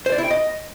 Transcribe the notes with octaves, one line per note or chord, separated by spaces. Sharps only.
C5
D5
E4
G5
D#5